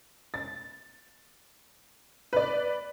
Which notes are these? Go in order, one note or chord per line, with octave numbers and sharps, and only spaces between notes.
A6
B4 D5